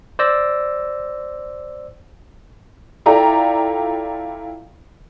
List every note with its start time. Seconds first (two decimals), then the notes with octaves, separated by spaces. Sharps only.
0.19 C5 D5 E6 A#6
3.06 E4 F4 A4 D5 G5 A#5